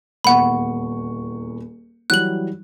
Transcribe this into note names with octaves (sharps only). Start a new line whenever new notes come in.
D#1 E2 F#5 B5 C#6
E3 F#3 G3 F#6 F#7